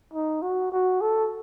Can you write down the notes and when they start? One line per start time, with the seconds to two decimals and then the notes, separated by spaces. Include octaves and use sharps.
0.14 D#4
0.42 F#4
0.72 F#4
1.02 A4